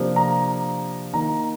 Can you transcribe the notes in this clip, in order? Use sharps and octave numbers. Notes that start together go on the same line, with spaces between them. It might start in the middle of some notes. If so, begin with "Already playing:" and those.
Already playing: C3 F3 A#3 D4
A#5
D#3 A#3 D#4 A#5